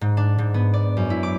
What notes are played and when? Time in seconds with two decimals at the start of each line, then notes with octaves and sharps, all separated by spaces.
0.01 G#2
0.17 D4
0.38 G#2
0.54 B3
0.74 D5
0.97 F#2
1.10 E4
1.23 D6